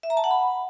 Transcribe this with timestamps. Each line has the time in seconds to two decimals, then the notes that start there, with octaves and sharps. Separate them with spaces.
0.03 E5
0.10 A#5
0.17 A5
0.24 F#5
0.31 B5